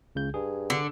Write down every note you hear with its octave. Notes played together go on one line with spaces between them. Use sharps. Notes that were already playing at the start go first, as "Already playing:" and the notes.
C#2 C#3 G6
G2 G#4
D3